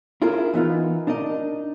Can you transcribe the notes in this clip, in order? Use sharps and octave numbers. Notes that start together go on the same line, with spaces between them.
E4 F4 G#4 A#4
E3 B3 D#4 F4
D4 D#4 A#4 D#5